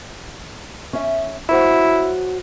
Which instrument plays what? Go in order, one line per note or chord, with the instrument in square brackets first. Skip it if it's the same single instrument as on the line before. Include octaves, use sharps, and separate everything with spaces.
[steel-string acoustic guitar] C#4 E5
[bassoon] E4 [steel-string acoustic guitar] F#4 C5 C#5